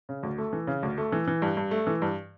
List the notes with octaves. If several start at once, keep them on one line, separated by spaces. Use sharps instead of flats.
C#3
D2
A3
E3
C#3
D2
A3
E3
E3
G2
G2
A3
E3
G2